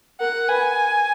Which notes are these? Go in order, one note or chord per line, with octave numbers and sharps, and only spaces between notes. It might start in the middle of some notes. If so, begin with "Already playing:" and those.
A#4 F#5
B4 G#5